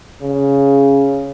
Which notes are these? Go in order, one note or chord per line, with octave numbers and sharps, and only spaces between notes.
C#3